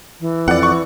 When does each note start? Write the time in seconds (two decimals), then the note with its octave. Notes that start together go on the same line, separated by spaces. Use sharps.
0.21 E3
0.48 F2 D5 F#5
0.63 C#6